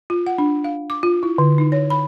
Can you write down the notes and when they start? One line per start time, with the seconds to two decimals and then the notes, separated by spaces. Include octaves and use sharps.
0.10 F4
0.27 F#5
0.38 D4
0.64 F5
0.90 D6
1.03 F4
1.23 E4
1.38 D3
1.58 D#4
1.72 C#5
1.90 B5